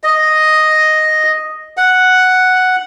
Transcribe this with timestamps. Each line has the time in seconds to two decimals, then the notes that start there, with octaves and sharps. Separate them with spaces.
0.04 D#5
1.77 F#5